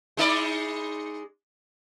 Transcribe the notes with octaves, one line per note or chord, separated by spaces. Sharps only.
G#3 D#4 D5